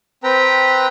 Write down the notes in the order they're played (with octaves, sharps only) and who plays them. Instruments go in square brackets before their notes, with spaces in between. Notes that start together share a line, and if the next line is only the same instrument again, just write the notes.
[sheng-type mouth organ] C4 B4 G5 A#5